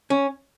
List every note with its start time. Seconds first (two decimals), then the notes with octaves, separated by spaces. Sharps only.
0.10 C#4